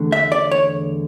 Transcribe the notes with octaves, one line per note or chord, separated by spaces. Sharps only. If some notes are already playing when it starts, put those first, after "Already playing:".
Already playing: E2 D3 A3
E5
D5
C#5